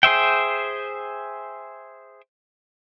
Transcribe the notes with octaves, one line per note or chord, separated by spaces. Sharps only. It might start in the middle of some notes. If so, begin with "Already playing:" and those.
G#4 C5 E5 G5